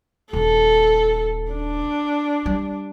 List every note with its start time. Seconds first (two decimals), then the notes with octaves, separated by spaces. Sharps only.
0.33 D#1 A4
1.52 D4
2.46 G3